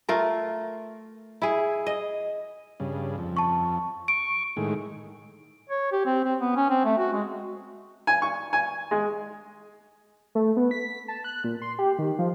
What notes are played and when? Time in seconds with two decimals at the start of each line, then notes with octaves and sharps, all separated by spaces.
0.09 A3 F4 A#4
1.42 E4 G#4
1.86 D#5
2.80 G2 C#3
3.18 F2
3.37 A5 C#6
4.08 C#6 D7
4.57 A2 D#3 G#3
5.69 C#5
5.92 G4
6.06 C4
6.24 C4
6.40 B3
6.56 C#4
6.70 C4
6.85 A3
6.98 F#4
7.13 G#3
8.07 G#5
8.22 C#6
8.53 G#5
8.91 G#3
10.35 A3
10.57 B3
10.71 B6
11.08 A5
11.24 F#6
11.44 A#2
11.62 C6
11.79 G4
11.99 D#3
12.19 F3